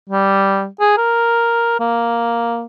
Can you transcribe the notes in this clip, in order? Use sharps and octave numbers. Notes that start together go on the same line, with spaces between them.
G3
G#4
A#4
A#3